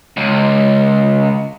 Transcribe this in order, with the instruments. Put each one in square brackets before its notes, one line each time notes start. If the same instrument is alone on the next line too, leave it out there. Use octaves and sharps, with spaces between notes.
[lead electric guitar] C#2